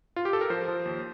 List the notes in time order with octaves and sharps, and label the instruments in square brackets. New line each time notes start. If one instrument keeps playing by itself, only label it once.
[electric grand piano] F4
G4
A4
A#4
F3 C5
F3
D#2